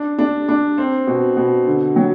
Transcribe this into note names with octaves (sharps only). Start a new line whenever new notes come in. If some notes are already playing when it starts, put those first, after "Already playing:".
Already playing: D4
D4
D4
C4
B2
B2
D3
F#3